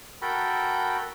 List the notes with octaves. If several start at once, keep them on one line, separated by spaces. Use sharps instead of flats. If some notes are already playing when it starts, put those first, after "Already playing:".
F#4 A4 A#4 G5 B5